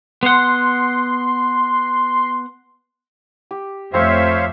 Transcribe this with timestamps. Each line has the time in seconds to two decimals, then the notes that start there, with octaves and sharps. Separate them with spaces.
0.23 B3 F#5 C6
3.51 G4
3.94 F2 A3 C4 C5 C#5 E5 F5 C#6